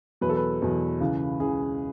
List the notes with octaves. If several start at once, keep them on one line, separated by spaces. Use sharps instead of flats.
E2 B2 F#3 B4
A4
B4
E2 B2 F#3
C#2 C#3 E3
C#2 C#3 E3 G#4